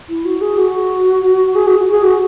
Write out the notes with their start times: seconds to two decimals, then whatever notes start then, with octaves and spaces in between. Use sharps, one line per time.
0.09 E4
0.25 F#4
0.41 G#4
0.58 F#4
1.55 G#4
1.67 F#4
1.79 F#4
1.92 G#4
2.04 F#4